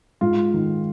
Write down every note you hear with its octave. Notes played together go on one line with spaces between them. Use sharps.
G#2 F4
D#3